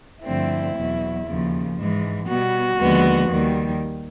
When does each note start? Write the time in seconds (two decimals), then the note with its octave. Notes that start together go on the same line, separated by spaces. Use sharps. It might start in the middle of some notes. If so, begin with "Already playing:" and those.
0.23 G2 D3 F3 A3 C4 E4
0.74 E2 B2 F#3
1.25 D#2 C#3 F3
1.77 G#2 E3 G#3
2.28 B2 G3 B3 F#4
2.79 D#2 D3 F3 G#3 B3
3.29 D#2 D#3 G3